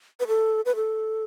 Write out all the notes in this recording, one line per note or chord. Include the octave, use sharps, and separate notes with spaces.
B4
A4
B4
A4